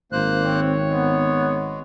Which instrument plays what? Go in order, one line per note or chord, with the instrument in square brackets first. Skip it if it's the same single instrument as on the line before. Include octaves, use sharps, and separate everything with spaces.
[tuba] G#1 [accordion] A#3 C5 F#6
[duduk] C4 [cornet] C#5
[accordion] G#3 [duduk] B3